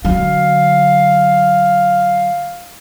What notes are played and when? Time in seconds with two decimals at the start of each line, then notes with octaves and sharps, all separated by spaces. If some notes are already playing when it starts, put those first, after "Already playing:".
0.05 D3 F#3 F5